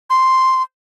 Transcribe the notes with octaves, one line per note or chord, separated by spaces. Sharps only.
C6